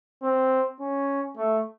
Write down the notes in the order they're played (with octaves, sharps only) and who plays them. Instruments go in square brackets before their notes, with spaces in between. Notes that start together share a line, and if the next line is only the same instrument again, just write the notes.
[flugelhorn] C4
C#4
A3